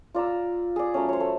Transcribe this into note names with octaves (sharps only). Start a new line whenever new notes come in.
F4 D5 A#5 E6
G#4 D5
F#3 A3 C#4
C5 C#5
A3